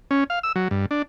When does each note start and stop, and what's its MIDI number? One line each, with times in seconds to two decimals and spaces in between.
0.11 0.24 61
0.30 0.39 77
0.43 0.52 88
0.56 0.68 54
0.71 0.86 43
0.91 1.02 62